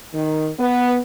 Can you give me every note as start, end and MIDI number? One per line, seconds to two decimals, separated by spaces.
0.13 0.48 51
0.59 0.98 59